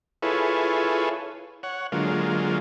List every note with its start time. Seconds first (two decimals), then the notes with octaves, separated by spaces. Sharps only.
0.22 E4 F4 G#4 A4 B4 C#5
1.63 C#5 F#5
1.92 D3 F#3 G#3 A#3 F4